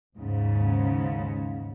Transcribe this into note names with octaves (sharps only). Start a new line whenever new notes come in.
D#2 G#2 C#3